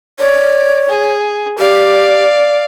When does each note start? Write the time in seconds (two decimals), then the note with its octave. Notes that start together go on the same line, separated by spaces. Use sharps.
0.20 C#5 D5
0.89 G#4
1.59 G4 D5 F5